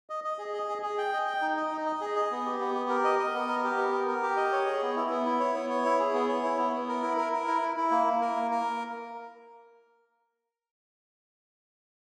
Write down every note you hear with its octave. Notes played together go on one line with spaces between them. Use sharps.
D#5
D#5
G#4
D#5
G#4
G#4
G5
D#5
G5
D#4
D#5
D#4
D#5
G#4
D#5
B3
G4
B3
G4
A#4
D#5
D#5
B3
A#4
G4
B3
A#4
A#4
G4
D#5
C#5
G#4
B3
E4
B3
E4
C#5
B3
C#5
E4
G#4
B3
C#5
E4
B3
B3
A#4
E4
A#4
A#4
E4
E4
E4
A#3
A#3
A#4
A#3
A#4